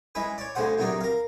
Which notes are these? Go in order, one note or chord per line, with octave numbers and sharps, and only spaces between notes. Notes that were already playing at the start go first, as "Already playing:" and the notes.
E3 G#3 C#4 B4
C#5 D5
D2 A2 C#3 G#4 C5 F#5
E2 C3 D#3 F#3 D4 D#4
A#4 F5